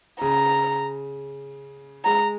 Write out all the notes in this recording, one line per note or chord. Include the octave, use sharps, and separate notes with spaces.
C#3 A#5
G#3 A#5